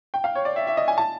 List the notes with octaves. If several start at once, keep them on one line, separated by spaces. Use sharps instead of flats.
G5
F5
C#5
D5
E5
E5
D#5
G#5
A5